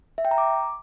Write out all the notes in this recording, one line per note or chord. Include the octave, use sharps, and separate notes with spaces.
E5
G5
A#5
D6